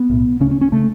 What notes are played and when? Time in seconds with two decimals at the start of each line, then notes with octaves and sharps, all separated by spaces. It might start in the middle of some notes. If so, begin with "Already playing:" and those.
Already playing: B3
0.10 B1 A2
0.40 D2 C#3 C#4
0.51 C#4
0.61 C#4
0.72 C#3 A3